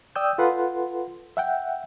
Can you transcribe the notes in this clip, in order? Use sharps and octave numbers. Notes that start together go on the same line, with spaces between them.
D5 G5 D#6 E6 G6
F4 A4 B4 F#5 C6
E5 F#5 G5